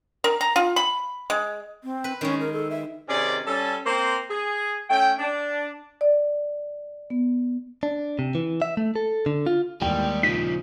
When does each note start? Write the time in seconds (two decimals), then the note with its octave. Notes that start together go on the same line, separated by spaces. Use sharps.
0.24 A#4
0.41 A#5
0.56 F4
0.76 B5
1.30 G#3
1.84 C4
2.04 B4
2.21 D#3 G#3 C#4
2.40 A#4
2.53 A4
2.70 E5
3.09 C3 D#3 C#4 G#4 D5
3.46 G3 C#4 A4
3.85 A#3 C4 C5
4.30 G#4
4.88 A3 C#4 G5
5.19 D4
6.01 D5
7.10 B3
7.83 D4
8.19 C3
8.35 E3
8.62 E5
8.77 A3
8.96 A4
9.26 D3
9.46 F4
9.82 D#2 A2 E3 G3 G#3 G5
10.23 A#2 C#3 F3 D#4 B6